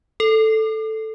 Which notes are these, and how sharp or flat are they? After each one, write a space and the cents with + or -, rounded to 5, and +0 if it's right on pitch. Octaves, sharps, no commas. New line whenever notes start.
A4 +0